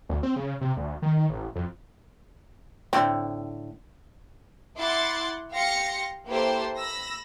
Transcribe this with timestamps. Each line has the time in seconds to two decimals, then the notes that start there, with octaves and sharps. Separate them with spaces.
0.09 D2
0.23 C4
0.36 C#3
0.61 C3
0.77 D2
1.02 D#3
1.30 A1
1.55 F2
2.93 A2 D3 C4
4.76 E4 F#5 C6 D6 A6
5.53 G4 F5 C6 A#6 C#7
6.28 A#3 E4 G4 A4 B4 C5
6.76 B5 E6 A#6